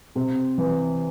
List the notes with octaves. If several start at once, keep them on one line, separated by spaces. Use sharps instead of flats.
C3
E3